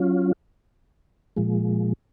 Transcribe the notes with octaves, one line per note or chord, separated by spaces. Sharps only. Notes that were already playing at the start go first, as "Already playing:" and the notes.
Already playing: F#3 C#4 F4
A#2 F3 G#3